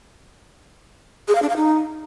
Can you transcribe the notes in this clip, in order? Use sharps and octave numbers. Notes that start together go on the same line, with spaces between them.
G#4
F5
D4
F5
D#4